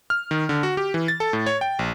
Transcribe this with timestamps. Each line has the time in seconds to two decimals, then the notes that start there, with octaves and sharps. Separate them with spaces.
0.10 F6
0.31 D#3
0.49 D3
0.63 F#4
0.77 G4
0.94 E3
1.08 A6
1.20 A4
1.33 A2
1.46 C#5
1.61 G5
1.79 A#1